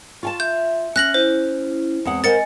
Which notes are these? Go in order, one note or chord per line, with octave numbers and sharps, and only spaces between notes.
F4 G#5 A5 C#6
E5 G6
C#4 F#6 A#6 F#7
E4 C5
E2 G#3 C4 F#5 D#6
A#4 C5 D#5 F#5 G#5 A6 C#7